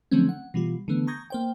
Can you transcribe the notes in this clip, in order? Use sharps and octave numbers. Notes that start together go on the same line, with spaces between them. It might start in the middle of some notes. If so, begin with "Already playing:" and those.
D3 F3 F#3 A3 C4 C#4
F#5
B2 E3 G3 F4
D3 E3 A3 B3
A#5 C#6 D#6 G6 G#6 A#6
A#3 C5 G5